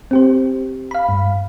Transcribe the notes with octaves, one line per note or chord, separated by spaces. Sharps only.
C4 G4 C5
F5 B5
G2